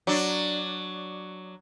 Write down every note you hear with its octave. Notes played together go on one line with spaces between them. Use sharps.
F#3 D4